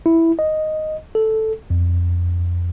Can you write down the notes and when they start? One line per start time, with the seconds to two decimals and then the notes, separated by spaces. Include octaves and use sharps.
0.06 E4
0.39 D#5
1.15 A4
1.70 F2